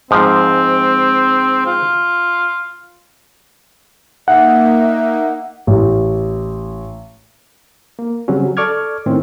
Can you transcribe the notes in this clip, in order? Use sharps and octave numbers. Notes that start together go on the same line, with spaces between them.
G#2 F3 C4
F4
A#3 D#4 E5 F#5
A1
A#3
C#3 F#3 G3 C4 C#4
A4 D5 C#6 D6 F6 G#6
A2 D#3 A3 C4 C#4